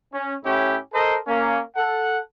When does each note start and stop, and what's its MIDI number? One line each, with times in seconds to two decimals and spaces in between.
0.13 0.34 61
0.45 0.77 45
0.45 0.77 61
0.45 0.77 64
0.45 0.77 67
0.94 1.17 69
0.94 1.17 70
0.94 1.17 72
0.94 1.17 75
1.27 1.59 58
1.27 1.59 61
1.76 2.19 69
1.76 2.19 78